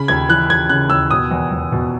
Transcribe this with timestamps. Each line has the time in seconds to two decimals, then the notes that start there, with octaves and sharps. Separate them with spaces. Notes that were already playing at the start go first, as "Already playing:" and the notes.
Already playing: C#3 B5
0.08 D#2 G#6
0.29 E3 F#6
0.50 D#2 G#6
0.69 C#3 F#6
0.90 D#2 E6
1.11 B2 D#6
1.31 E2
1.52 E2
1.72 B2